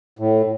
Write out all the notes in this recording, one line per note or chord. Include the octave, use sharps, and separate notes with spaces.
A2